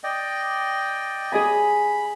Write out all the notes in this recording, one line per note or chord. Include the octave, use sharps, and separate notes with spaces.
D5 D#5 G5
G#4 D#5 G#5 B5